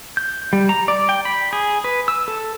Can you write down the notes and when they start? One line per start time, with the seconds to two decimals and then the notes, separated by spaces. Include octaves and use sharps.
0.17 G6
0.53 G3
0.69 A#5
0.88 D5
1.09 G5
1.25 B5
1.53 G#4
1.84 B4
2.08 E6
2.28 A4